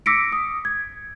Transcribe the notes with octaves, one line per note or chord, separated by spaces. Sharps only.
D6 E6 A#6 B6 C#7 D7
D#6
G#6